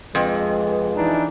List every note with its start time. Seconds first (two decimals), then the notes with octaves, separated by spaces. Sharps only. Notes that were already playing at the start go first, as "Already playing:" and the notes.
0.15 F2 G#3 B4
0.96 E3 D4 D#4